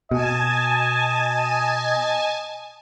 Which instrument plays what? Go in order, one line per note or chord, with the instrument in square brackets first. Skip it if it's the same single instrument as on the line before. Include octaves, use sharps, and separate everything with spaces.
[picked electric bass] B2 [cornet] D#5 [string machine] G#5 A5